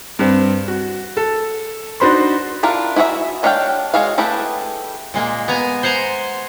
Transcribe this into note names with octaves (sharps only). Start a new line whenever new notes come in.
G2 C4
F#4
A4
D4 D#4 F#4 C5 B5 C6
D4 E4 F4 A#4
E4 F#4 G#4 C#5 E5
G#3 D4 C#5 F5 G5
G#3 F#4 G#4 C#5 F5
A3 E4 G4 G#4 B4
A#2 G#3 A#3
B3 G#5 A#5
C5 F#5 G#5 A#5